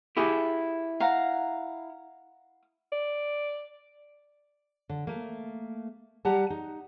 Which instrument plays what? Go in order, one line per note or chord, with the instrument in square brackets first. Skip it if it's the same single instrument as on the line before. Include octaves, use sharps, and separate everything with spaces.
[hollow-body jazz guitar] E4 G4 G#4
[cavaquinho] F5 F#5 A#5
[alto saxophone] D5
[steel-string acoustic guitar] D3
A3 A#3
G3 G4 F#5 A5 A#5
D#4